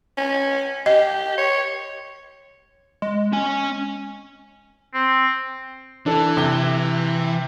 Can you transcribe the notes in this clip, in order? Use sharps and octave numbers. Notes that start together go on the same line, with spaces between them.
C#4
G4 D#5
C#5
G#3
C#4 G#5
C4
E3 D4 A4
C3 G7